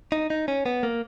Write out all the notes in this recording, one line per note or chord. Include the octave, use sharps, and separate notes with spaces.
D#4
D#4
C#4
B3
A#3